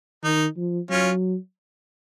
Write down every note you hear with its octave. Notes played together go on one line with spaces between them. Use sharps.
D#3 D#4
F3
F#3 C#4 F4